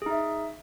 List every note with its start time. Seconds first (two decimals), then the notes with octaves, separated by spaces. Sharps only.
0.02 G#4
0.06 D#4
0.11 E5